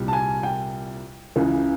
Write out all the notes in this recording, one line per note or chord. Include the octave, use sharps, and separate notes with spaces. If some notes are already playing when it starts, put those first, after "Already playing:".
Already playing: C2 A#2 G3
A5
G#5
G5
C#2 C#3 E3